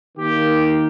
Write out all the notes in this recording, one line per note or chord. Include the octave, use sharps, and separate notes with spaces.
D#3 A#3 G4